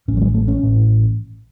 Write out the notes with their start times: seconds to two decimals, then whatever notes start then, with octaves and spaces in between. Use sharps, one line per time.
0.08 A1 A2 C#4
0.17 F#3
0.22 G#3
0.34 A3
0.48 C#4
0.62 A1 A2